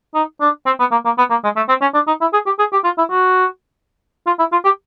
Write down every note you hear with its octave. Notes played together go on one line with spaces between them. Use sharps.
D#4
D4
C4
B3
A#3
A#3
B3
A#3
G#3
A3
C4
C#4
D4
D#4
E4
G#4
G4
G#4
G4
F4
E4
F#4
F4
E4
F4
G4